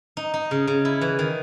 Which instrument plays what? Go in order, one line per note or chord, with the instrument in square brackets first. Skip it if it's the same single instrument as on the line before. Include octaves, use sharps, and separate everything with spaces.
[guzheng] D#4
D#4
C#3
C#3
E4
E3
D#3